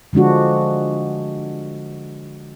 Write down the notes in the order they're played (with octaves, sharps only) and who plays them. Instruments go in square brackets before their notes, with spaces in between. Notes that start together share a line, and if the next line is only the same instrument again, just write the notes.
[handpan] D3 F3 G#3 D4 F#4